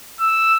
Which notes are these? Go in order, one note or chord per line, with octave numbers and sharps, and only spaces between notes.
E6